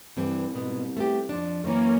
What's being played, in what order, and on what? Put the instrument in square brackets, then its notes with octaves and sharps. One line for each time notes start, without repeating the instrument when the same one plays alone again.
[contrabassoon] C2 [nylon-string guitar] G2 E3 C4
[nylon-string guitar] G#2 B2 B3
A3 B3 G4
F2 F3 D4
[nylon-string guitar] F#2 E3 [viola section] A#3 C#4